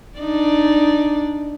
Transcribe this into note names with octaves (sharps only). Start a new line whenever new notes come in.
D4 D#4 D5